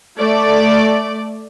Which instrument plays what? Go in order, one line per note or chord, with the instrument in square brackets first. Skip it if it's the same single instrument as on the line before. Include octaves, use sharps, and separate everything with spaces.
[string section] A3 D5